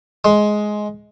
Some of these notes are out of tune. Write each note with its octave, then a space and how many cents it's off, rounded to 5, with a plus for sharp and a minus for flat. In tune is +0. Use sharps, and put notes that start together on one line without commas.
G#3 +10 C6 +0